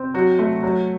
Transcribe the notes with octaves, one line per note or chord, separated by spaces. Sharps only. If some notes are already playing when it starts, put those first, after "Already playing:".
Already playing: C4
F#3 F#4
A3
F#3